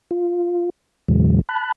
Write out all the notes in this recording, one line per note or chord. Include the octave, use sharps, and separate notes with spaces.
F4
E2 A#2 C#3 E3 F#3 G#3
A5 B5 F#6